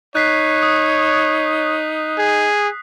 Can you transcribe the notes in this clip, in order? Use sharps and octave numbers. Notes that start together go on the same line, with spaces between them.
D#4 C#5 F#6 B6 C7
D#6
G#4